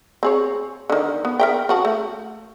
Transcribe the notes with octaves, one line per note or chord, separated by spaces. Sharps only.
C4 G#4 C#5
D3 D#3
B3
A#4 E5 G5
C#3 F#4 A5
A3